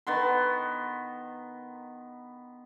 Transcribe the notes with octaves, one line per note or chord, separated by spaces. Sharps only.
D#3 B3 C6